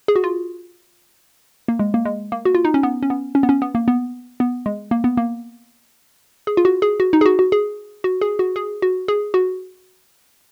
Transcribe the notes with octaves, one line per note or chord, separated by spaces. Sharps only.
G#4
F#4
F4
A#3
G#3
A#3
G#3
A#3
F#4
F4
D#4
C#4
B3
C#4
B3
C#4
B3
C#4
B3
A#3
B3
B3
G#3
A#3
B3
A#3
G#4
F4
F#4
G#4
F#4
D#4
G#4
F#4
F#4
G#4
F#4
G#4
F#4
G#4
F#4
G#4
F#4